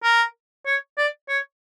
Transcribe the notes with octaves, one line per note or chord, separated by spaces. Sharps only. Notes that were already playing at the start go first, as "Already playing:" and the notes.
A#4
C#5
D5
C#5